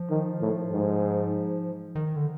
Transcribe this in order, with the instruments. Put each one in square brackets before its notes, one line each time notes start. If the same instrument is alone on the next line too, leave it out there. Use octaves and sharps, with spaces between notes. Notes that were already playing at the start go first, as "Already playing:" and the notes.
Already playing: [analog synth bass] F3
[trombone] D#3
A2
G#2
[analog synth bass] D#3
D3